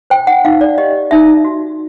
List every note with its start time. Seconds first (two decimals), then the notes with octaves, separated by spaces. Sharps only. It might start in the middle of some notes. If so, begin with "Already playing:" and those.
0.10 C5 G5
0.27 F#5
0.45 D#4 F5
0.61 D5
0.78 G4 D#5
1.11 D#4 E5
1.45 F#4